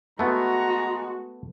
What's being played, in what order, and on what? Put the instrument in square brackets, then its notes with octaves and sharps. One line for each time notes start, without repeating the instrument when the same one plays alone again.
[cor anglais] G#3 [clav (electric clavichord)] A3 B3 [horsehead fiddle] F#4 [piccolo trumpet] A#5